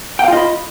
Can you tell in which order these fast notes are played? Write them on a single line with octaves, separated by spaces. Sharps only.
G5 F5 F4 D#5 B5